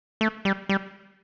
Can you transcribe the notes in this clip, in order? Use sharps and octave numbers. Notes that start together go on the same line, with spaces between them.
A3
G3
G3